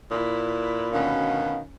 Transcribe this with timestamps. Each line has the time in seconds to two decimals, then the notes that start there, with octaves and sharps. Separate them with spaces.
0.11 A#2 E4 B4
0.92 D2 B2 D#3 C#4 B4 F5